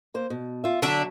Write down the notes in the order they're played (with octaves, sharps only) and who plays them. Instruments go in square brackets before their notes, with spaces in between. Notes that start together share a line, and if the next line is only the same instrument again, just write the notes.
[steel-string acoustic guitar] A#3 C5
B2
F4 E5
[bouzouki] D3 D4 E5 [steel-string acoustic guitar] F#3